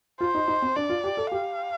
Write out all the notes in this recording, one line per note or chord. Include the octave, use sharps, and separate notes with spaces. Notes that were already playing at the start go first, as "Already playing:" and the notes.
F4 C5
D#4
D#4
C4
D4 D5
F4
G4
A4
G4 F5